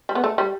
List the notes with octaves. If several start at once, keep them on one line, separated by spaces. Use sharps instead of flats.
G3
B3
A3
G3